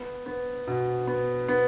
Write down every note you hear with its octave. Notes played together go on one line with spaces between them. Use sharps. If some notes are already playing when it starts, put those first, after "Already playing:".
Already playing: B3
B3
B2
B3
B3